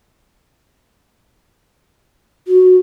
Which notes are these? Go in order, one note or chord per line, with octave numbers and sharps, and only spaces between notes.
F#4